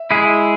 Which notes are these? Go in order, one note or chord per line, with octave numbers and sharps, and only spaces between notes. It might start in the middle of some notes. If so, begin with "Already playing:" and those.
Already playing: E5
G#3 E4 G#4